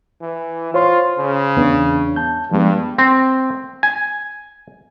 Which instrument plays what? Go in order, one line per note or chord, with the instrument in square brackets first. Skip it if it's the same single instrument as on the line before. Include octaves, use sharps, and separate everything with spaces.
[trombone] E3
[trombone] F4 [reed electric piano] C5 C#5 C6
[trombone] C#3
[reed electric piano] E2 B3 D4
A5 G6
[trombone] G2 [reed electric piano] F3 G#3 B3
[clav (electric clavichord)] C4
G#5